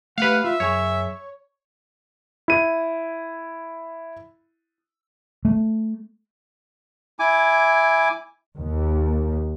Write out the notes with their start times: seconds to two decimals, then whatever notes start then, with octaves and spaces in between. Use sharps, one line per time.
0.18 A3 G4 B4 F5 F#5
0.44 F4 E5
0.60 F#2 G#4 C#5 G#5
2.48 E4 D#7
5.45 A3
7.19 E4 G#5 D6
8.57 D#2